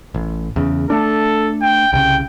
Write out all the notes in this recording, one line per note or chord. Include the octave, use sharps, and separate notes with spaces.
A1
E2 C#3
A3 D4 A4
G5
C2 C#3 G5